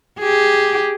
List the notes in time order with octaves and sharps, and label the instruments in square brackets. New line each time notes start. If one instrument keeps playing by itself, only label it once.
[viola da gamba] G4 G#4